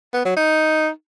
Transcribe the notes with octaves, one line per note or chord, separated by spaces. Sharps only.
B3
F#3
D#4